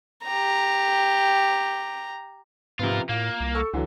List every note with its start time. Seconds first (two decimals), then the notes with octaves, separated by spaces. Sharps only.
0.25 G4 A#5
2.79 G#2 C3 F3 B3 F4 A#4
3.09 A2 A#3 F4
3.40 C2
3.55 A4 C#6 E6
3.73 C#2 D3 E3 F#3